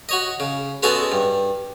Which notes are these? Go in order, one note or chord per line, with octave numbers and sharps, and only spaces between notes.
F#4 C#5 D#5
C#3
G#3 B3 C#4 F#4 G#4 A4
G2